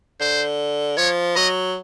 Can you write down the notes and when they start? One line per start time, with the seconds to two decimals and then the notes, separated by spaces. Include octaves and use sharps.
0.20 D3 C5
0.98 F3 C#5
1.36 F#3 D#5